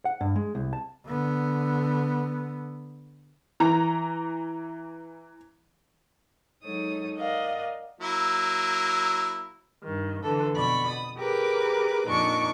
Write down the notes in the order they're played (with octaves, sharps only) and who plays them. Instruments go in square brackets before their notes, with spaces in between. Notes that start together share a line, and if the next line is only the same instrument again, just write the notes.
[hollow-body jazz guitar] F#5
G2
G#3
C2
A5
[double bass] D3 B3
[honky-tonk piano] E3 A#5
[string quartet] F#3 G#3 D#4 A4 C#5 D#6
A#4 D5 D#5 F5 F#5
[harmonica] F#3 A#3 E4
[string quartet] G2 D#3
D3 E3 A4
F2 B2 D5 B5 C#6
D#6
G4 G#4 A#4 B4 D6
F2 A#2 D4 D#4 C#6 D6